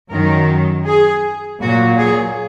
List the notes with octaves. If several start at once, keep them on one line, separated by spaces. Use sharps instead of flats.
F#2 D#3 F#3 A#4
G#4
A#2 F#3 F#4
G#4